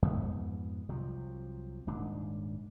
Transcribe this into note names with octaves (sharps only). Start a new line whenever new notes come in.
F2 G#2 B3
C2 C3 F3 F#3
D#1 G#2 D4